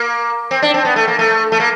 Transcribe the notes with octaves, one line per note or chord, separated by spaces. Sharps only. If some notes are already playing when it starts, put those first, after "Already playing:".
Already playing: A#3
C4
D4
C4
B3
A3
A#3
A3
A3
A#3